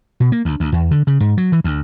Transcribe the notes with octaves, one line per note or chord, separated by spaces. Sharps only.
B2
A#3
D2
D2
E2
D3
C#3
G#2
F#3
E3
D2